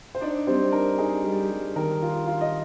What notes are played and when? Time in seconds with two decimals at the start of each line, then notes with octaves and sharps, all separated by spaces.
0.15 C5
0.21 D4 D#4 D5
0.47 G3 C4 C5
0.72 D#4 A#4
0.98 D#4 G#4
1.24 G3
1.50 G3
1.76 D#3 A#4
2.02 F4
2.27 F4 F5
2.41 D#5